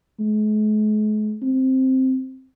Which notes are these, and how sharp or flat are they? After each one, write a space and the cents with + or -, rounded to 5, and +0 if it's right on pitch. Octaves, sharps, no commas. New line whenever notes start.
G#3 +45
C4 +0